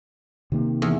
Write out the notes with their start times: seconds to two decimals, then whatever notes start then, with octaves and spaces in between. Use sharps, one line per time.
0.52 C3 D#3 A#3
0.82 E2